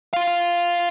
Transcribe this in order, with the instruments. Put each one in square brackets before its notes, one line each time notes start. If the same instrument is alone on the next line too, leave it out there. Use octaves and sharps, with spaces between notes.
[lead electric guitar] F4 F5